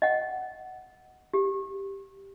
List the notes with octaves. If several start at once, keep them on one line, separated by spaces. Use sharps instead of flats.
D#5 F#5
G4